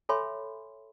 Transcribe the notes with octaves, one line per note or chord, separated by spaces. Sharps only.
A4 C#5 E5 G#5 B5 C6